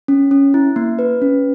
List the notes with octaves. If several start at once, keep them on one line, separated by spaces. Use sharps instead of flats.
C#4
C#4
E4
A#3
B4
C#4